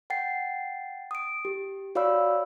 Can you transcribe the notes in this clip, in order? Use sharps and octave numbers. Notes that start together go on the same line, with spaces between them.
F#5 G5 A6 C7
D#6 D7
G4
F#4 C#5 D5 F5 B5 E6